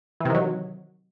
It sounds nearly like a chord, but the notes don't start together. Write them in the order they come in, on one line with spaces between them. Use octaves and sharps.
E3 C3 D#3 F#3